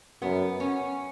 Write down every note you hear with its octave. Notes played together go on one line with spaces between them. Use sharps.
F#2 B3
C#4